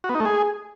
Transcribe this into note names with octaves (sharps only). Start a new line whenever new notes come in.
F#4
B3
D#4
A3
G#4